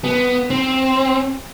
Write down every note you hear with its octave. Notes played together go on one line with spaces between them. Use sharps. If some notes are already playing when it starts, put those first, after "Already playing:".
B3
C4